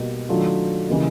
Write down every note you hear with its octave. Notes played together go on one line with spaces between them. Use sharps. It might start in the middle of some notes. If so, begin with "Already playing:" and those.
Already playing: B2 G3 A#3 D#4 F#4
D#3 F#3 A3 D4 F4
C#3 E3 G3 A#3 D#4